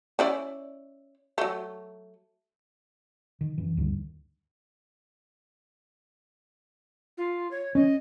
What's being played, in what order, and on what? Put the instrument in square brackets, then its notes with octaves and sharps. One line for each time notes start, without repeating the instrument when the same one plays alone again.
[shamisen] C#4 E4 D5
F#3 A3
[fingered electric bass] D#3
F#2 E3
D2 G2 D#3
[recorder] F4
C#5
[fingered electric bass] C#4 [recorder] D#5